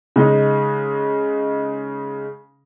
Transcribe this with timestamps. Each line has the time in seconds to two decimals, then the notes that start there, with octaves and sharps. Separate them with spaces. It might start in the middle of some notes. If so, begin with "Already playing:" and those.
0.16 C#3 G#3 D#4